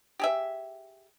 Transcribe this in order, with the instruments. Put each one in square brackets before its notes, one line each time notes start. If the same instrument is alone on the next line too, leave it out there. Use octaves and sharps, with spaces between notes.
[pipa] G4 G#4 E5